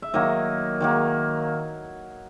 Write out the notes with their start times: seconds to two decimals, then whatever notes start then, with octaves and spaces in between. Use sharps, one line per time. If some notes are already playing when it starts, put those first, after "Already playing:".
0.02 E5
0.14 D#3 F#3 A#3 D#5
0.80 D#3 F#3 A#3